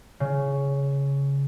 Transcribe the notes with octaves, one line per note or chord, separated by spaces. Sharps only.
C#3